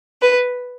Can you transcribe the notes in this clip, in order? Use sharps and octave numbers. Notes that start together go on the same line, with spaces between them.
B4